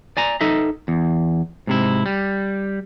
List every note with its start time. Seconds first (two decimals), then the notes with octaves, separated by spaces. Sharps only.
0.17 D5 G#5 A#5
0.41 D#4 A4 D#5 E5
0.88 E2
1.67 G#2 C3 E4
2.06 G3